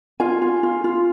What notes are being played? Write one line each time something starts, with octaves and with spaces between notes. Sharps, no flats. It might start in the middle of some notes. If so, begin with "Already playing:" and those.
F4 G#5
F4
F4
F4